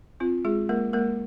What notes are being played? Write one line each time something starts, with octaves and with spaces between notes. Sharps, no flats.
C4 F4
G#3 F4 G#4
G#3 A#3 A#4
G#3 A#3 A#4